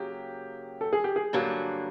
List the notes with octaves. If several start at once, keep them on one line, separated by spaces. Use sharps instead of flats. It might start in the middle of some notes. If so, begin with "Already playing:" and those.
Already playing: C#3 F#3 A#3 G4
A4
G#4
G4
G#4
G2 D3 F#3 A#3